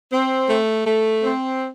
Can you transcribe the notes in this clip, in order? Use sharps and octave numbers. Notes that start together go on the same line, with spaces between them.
C4
A3
A3
C4